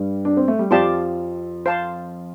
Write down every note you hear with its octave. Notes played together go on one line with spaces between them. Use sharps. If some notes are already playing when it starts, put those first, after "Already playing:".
Already playing: G2 G3
D4
C4
A3
G3
F2 F3 G4 D5 F5 A5 C6
C5 F5 A5 C6